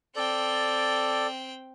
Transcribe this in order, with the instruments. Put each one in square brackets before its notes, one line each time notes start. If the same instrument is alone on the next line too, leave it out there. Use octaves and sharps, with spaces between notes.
[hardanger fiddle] C4 G5 [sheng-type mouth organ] A4 D5